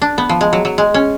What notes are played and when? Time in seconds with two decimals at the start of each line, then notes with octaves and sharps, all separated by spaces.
0.02 D4
0.18 B3
0.29 F3
0.41 G#3
0.53 F#3
0.65 F#3
0.78 G#3
0.94 C#4